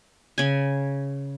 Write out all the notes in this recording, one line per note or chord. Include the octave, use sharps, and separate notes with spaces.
C#3 G#5